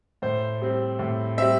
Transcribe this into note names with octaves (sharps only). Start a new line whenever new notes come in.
A2 C5
G3 C4
A2
G3 C4 E5